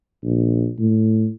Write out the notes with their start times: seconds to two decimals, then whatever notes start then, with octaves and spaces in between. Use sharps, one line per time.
0.23 A#1
0.78 A2